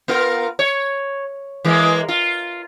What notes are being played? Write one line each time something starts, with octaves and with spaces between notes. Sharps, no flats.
B3 F4 A#4
C#5
E3 G#3 A#3
F4